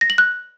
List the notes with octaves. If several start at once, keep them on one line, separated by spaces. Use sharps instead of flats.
A#6
F#7
F#6